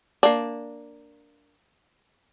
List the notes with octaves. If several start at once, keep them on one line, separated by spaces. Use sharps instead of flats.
A#3 D4